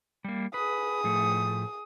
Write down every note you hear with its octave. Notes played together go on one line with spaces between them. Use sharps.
G3 A#3
G#4 B4 D#6
A2 F3 A3